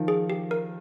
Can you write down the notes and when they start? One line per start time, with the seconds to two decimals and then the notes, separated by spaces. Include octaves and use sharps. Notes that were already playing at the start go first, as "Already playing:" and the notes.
Already playing: D#3 F3
0.08 G#4
0.30 G4
0.51 A#4